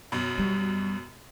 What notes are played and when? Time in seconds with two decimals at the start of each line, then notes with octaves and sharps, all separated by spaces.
0.12 F#2 B2
0.38 G3